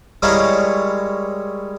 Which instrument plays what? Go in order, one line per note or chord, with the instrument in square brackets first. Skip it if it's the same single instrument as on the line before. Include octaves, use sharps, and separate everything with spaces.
[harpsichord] G3 G#3 E4 A#4 C#5 F5